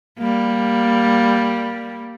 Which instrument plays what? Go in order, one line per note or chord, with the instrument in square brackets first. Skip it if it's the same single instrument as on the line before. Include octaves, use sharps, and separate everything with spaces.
[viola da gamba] G3 A#3